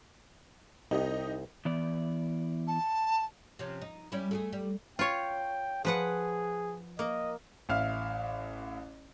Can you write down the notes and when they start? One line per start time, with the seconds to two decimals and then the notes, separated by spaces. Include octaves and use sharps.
0.91 C2 D#4 G4 D#5
1.65 E3 B3 D5
2.67 A5
3.59 C3 F3 C#4
3.81 D#4
4.12 G3 C#4 E4
4.31 A3 G4 G#4
4.53 G3
4.99 F4 C#5 G5
5.85 F3 G#4 B4 F#5
6.99 A#3 D#5
7.69 A1 E5 F5 F6